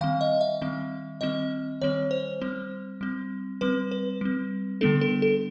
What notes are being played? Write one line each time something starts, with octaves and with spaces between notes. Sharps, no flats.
D#3 G3 C4 F5
D#5
E5
D#3 G3 C4
D#3 G3 C4 D#5
D#3 G3 C4 C#5
C5
G3 C4
G3 C4
G3 C4 B4
B4
G3 C4
D3 G3 B3 D4 A4
A4
A4